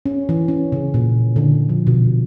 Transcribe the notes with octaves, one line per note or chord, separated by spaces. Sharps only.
C#4
E3
C#4
C#3
A#2
D3
F3
B2